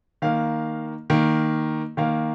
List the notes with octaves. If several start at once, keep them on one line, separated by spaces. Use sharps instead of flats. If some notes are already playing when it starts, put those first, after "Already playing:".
D#3 A#3 F5
D#3 A#3
D#3 A#3 F5